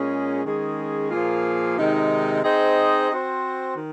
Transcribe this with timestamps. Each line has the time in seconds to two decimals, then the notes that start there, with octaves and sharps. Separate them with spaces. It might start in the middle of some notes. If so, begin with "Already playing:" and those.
Already playing: A#2 G#3 C#4 G#4
0.44 D#3 G#3 C#4 G#4
1.11 A#2 F3 A#3 F4 G#4
1.76 C3 D#3 G#3 D#4
2.44 C4 D#4 G#4 C5 D#5
3.10 C4 F#4 C5
3.76 D#3